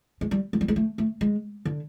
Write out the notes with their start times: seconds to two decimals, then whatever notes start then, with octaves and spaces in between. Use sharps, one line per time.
0.21 G#3
0.31 G3
0.53 G#3
0.61 G3
0.68 G#3
0.76 A3
0.98 A3
1.21 G#3
1.65 D3